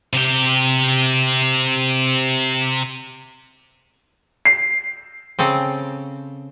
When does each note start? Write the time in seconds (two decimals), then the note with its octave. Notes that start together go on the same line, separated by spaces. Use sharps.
0.13 C3 G4
4.45 C7
5.39 C#3 C4 A4